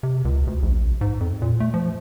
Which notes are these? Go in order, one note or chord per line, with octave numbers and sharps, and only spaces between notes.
C3
C#2
D2
A#1
G#2
F2
A#2
A3
F3